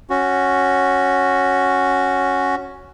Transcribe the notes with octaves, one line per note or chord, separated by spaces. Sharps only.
C#4 F#4